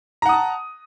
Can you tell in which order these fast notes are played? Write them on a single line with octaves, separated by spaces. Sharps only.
A#5 F#5 D#6 A5